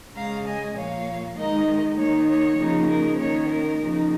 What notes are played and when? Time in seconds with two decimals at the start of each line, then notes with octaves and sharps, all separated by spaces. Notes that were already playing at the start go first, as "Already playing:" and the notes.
0.16 C#3 G#3 C#4 F5 A#5
0.46 D#5 G#5
0.76 A#2 F3 A#3 C#5 F5
1.37 D#3 G#3 D#4 A#4 D#5
1.97 D#3 A#3 D#4 C#5
2.28 C#5
2.58 C#3 F3 A#3 D#4
2.88 A#4
3.18 D#3 A#3 C#4 C#5
3.49 A#4
3.79 C#3 F3 A#3 D#4